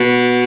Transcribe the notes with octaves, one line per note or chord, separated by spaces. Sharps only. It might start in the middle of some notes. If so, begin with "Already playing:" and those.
Already playing: B2